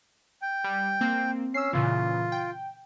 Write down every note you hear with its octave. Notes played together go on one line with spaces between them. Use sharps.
G5
G3
A#3 C4
C#4 E6 C7
A#2 C#3 E3 F4
G5